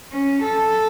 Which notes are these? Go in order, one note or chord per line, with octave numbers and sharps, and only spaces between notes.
C#4
A4